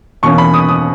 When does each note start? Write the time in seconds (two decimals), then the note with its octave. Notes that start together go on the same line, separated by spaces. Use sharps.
0.23 E2 B2 A#3 C#4 C#6
0.38 B5
0.54 D#6
0.69 D#6